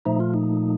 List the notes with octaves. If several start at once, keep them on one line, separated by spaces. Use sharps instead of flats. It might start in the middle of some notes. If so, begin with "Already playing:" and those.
A#2 F3 A3 D#4
F4
D#4